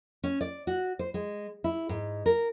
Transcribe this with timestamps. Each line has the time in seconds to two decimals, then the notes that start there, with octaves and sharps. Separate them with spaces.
0.24 C#4
0.41 D5
0.67 F#4
0.99 C5
1.14 G#3
1.64 E4
1.89 G#2
2.26 A#4